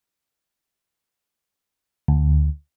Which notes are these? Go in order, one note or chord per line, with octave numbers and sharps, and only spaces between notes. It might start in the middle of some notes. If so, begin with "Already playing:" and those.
D2